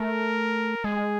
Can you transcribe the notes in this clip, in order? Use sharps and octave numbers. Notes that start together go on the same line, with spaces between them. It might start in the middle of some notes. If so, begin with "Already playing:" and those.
Already playing: A3 A#4
G#3 G#4